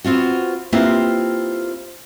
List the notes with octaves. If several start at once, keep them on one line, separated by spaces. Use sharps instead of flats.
B3 C4 F4 F#4
A#3 C4 E4 F4 G4 B4